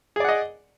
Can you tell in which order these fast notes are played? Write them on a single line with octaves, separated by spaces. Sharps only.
G#4 D5 F#5 D#5